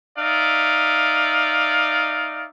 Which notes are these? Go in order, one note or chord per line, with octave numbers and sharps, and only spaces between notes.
D#4 D5 E5 F5